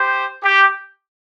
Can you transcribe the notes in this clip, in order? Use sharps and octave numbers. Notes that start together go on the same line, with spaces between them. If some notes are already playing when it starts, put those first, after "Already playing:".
Already playing: G4 C5
G4